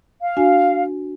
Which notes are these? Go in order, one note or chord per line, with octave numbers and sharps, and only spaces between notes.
F5
D4 F#4 G#5